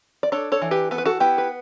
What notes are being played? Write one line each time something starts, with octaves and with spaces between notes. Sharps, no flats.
D5
D4 A4 C#5
A4 C#5
E3
G4 B4
B3 A4
B4
F#4 A4
B3 E4 G4
B4